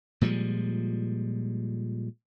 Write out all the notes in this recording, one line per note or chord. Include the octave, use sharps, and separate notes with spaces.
A#2 F3 G3 G#3